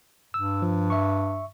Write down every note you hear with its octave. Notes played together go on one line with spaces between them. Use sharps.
G2 E6
F3
E5 C#6